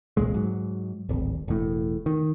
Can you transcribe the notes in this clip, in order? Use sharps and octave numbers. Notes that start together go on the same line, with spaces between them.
E1 C2 A#2 G#3
G#2 F#3
D1 G#1
E1 A2
D#3